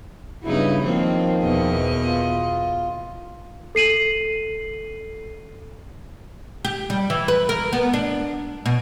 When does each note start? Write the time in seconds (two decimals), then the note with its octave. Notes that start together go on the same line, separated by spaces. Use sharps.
0.44 G2 C#3 F#3 B3 D#4 E4
0.82 D#3 F3 A#3 C4
1.41 E2 B2 D#5
2.05 F4
3.75 A4 C7 D#7 F#7
6.65 G4
6.90 G3
7.10 E3
7.28 B4
7.49 A#4
7.73 B3
7.94 D4
8.66 B2